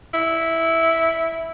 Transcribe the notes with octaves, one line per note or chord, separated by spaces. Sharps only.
E4